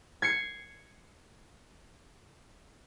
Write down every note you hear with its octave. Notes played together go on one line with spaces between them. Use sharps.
G#6 C7 C#7